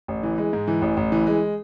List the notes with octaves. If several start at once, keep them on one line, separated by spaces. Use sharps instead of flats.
A1
E3
G#3
G#2
E3
A1
A1
E3
G#3